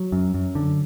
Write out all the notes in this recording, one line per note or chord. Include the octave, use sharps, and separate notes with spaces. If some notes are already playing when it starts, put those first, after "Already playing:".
Already playing: F#3
F#2
F#2
D3